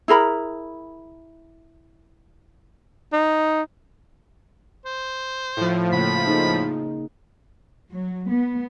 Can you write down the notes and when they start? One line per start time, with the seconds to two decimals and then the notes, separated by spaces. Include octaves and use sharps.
0.08 E4 G#4 A#4 B5
3.13 D#4
4.86 C5
5.57 A2 F3
5.93 C#3 A#3 F#5 B5
6.27 A#3 D#4 G#4
7.90 F#3
8.29 B3